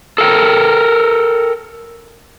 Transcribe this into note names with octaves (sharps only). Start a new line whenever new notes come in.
A4 A#4 F5 G5